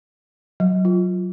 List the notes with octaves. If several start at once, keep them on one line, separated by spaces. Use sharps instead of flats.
F#3
F4